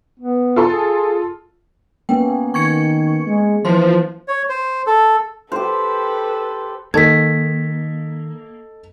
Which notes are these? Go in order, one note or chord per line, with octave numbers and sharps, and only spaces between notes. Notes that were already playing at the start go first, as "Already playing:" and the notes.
B3
F4 A4 C6
G#4
A#3 B3 C#4 G5
D#3 C#6 G#6 C#7
G#3
E3 F3 C5 C6
C#5
C5
A4
G4 A4 B4 C5
D#3 A#3 A4 D#5 G#6 B6